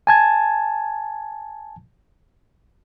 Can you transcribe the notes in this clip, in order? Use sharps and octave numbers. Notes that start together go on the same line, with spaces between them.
G#5 A5 G#6